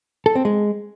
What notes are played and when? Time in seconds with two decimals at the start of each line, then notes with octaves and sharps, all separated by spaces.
0.26 A4
0.35 C4
0.45 G#3